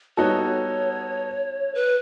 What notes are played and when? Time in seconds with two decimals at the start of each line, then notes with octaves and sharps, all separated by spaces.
0.17 G3 B3 D#4 F#4 A4 C#5
1.75 B4